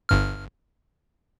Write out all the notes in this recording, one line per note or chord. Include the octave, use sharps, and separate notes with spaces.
G1 G2 F6